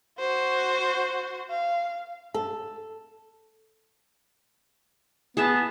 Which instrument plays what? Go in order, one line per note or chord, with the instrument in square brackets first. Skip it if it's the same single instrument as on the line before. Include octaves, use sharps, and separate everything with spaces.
[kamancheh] F#4 C5
F5
[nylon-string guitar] A4
[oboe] B3 [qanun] G#4 E5 A5